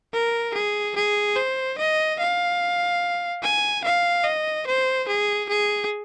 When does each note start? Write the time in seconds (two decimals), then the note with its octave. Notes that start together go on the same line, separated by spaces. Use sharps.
0.13 A#4
0.54 G#4
0.95 G#4
1.36 C5
1.78 D#5
2.19 F5
3.43 G#5
3.84 F5
4.24 D#5
4.67 C5
5.08 G#4
5.49 G#4